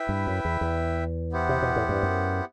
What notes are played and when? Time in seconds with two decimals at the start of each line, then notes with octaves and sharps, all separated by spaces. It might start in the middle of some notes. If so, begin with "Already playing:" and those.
Already playing: E4 B4 E5 G5
0.09 G2
0.27 F#2
0.45 E2
0.61 E2
1.32 B3 E4 G4 C5 F#5
1.49 C3
1.62 B2
1.76 A2
1.89 G2
2.03 F#2